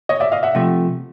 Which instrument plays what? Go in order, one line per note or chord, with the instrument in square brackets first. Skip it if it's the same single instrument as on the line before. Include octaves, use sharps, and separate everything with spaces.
[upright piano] C#5 D#5
D5 E5
D#5 F5
E5 F#5
[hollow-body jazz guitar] C3 F3 A3